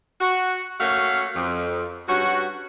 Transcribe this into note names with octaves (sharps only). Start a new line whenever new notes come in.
F#4
A3 A#3 C#4 F#4 F5
F2
G2 C#4 F#4